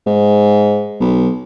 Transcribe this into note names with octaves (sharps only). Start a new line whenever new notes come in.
G#2
B1